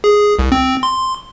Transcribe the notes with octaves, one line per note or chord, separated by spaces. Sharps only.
G#4
C2
C4
C6